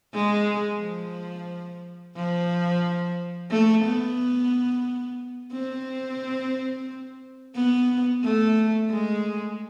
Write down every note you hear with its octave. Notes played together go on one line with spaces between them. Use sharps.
G#3
F3
F3
A3
B3
C4
B3
A3
G#3